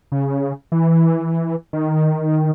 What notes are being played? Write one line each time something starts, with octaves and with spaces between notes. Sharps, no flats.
C#3
E3
D#3